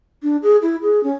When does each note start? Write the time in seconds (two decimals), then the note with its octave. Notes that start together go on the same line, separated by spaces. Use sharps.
0.23 D4
0.43 G#4
0.62 E4
0.82 G#4
1.03 C#4